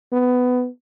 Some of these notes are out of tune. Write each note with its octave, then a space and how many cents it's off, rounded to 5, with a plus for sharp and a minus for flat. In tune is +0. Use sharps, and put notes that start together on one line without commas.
B3 +15